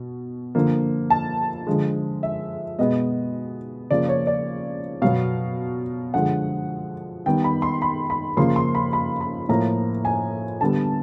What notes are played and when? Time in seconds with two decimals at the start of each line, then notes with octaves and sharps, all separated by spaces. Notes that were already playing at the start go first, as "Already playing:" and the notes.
Already playing: B2
0.55 D3 F3 A#3
1.10 A5
1.67 D3 F3 G#3
2.23 E5
2.79 B2 G#3 B3 D#5
3.91 C#3 F3 A#3 D5
4.09 C#5
4.27 D5
5.02 B2 F#3 B3 F5
6.14 D3 F3 G#3 F#5
7.26 D#3 G3 B3 G5
7.44 B5
7.62 C6
7.82 B5
8.10 B5
8.37 C#3 F3 A#3 C6
8.56 C6
8.75 B5
8.93 B5
9.21 B5
9.49 A2 F3 A#3 A#5
10.05 G#5
10.61 D3 G3 B3 A5